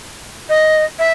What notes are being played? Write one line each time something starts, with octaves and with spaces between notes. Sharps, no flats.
D#5
E5